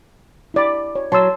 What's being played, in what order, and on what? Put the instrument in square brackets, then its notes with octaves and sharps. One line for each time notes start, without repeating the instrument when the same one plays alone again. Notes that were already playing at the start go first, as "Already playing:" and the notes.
[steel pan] E4 D5 B5
C#5
[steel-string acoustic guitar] F#3 [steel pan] A5 C6 E6